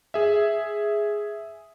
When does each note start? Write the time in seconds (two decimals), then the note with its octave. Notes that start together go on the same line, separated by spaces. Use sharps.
0.14 G#4 E5